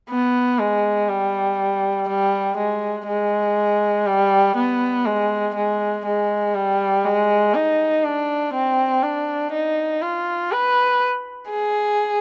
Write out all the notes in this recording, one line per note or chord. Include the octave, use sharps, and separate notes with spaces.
B3
G#3
G3
G3
G#3
G#3
G3
B3
G#3
G#3
G#3
G3
G#3
D#4
D4
C4
D4
D#4
F4
B4
G#4